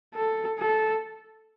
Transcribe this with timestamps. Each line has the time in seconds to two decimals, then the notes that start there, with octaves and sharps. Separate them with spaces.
0.14 A4
0.59 A4